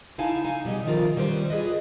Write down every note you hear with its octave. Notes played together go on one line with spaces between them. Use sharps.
C#3 D#4 E4 F5 G#5 A5
D#4 F5 G#5
B2 G3 G#4 D#5
C3 D#3 F3 A#3 F4 A#4
D#3 G3 C#4 B4 C5
F4 G#4 B4 D#5